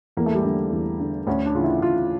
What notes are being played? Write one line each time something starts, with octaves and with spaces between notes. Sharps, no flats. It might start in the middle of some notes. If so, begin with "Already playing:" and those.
E2 A#3
A3
G3
D3 A3
E2
D3
D2 C#4
D4
C#3 E3 F4
E4
D2 F4